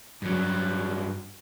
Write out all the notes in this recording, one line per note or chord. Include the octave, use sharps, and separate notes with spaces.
G2 F#3